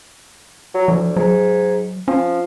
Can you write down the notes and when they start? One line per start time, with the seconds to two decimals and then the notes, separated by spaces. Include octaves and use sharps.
0.75 F#3
0.88 D2 F3
1.16 G#2 F#3
2.08 F3 C#4